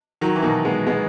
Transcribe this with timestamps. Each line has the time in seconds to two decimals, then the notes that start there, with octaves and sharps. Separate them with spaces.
0.21 D#3 F#3
0.36 E3
0.43 B2 D#3
0.65 G#3 B3
0.87 G#3 B3